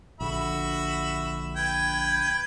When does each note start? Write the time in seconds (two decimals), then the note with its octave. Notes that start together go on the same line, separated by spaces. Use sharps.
0.21 A#1 D3 F#4 E5 B5
1.56 B4 G5 B5 G#6